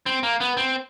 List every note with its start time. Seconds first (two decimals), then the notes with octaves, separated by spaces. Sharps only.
0.06 C4
0.23 A#3
0.40 B3
0.57 C4